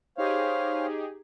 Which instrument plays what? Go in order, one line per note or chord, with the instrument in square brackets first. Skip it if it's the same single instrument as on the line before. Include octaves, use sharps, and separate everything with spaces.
[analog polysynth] D#4 G4 G#4 [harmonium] C5 C#5 F5